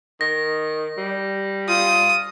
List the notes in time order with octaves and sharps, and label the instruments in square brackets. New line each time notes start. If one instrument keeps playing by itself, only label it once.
[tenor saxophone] D#3 [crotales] A#6
[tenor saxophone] G3
[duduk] F4 [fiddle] D#6